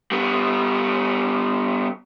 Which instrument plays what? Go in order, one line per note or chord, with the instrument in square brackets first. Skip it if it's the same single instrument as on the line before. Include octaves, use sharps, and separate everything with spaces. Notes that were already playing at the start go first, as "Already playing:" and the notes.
[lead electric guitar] G3 B3